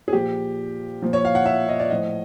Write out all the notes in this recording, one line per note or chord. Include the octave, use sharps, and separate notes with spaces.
G#4
A#2 F3 G4
A#2 F3
C#5
F5
F#5
E5
D#5
D5
A2 F3 D#5